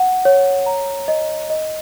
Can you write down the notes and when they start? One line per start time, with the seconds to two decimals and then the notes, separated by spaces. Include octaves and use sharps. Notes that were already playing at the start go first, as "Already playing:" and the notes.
Already playing: F#5
0.25 C#5
0.66 A#5
1.08 D#5
1.50 D#5